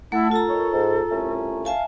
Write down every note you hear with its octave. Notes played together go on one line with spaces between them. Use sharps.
A3 E4 F#5 A5
F4 A4 A#5
D#3 C#5
G#2
C2 A3 C#4
E5 F5 G#5 A5